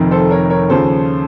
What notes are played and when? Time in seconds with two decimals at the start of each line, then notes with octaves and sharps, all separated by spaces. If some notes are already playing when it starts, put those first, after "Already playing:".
Already playing: F1 F2 D#3
0.11 A4 C5
0.31 A#4 C#5
0.50 A#4 C#5
0.70 D#2 C#3 F3 A4 C5